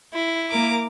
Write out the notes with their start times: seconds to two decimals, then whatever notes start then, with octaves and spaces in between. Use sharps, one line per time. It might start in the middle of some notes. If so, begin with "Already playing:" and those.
0.13 E4
0.50 A#3 A#4 D6